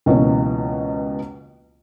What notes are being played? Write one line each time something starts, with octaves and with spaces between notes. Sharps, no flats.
C#2 B2 E3 A#3 C#4